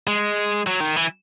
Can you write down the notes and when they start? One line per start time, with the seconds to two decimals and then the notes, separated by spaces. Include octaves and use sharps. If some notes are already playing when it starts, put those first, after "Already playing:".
0.07 G#3
0.67 F#3
0.80 D#3
0.96 E3